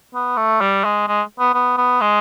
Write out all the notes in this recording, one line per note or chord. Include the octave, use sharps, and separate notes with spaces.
B3
A3
G3
G#3
G#3
B3
B3
B3
G#3